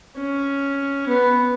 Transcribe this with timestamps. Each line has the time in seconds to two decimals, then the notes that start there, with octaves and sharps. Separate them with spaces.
0.17 C#4
1.09 B3